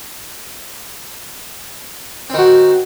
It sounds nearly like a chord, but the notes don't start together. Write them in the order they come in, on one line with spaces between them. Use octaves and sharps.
C4 D#3 F#4